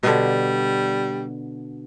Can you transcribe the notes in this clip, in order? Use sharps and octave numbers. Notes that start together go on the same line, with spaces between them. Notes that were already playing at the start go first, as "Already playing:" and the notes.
B2 D3 G3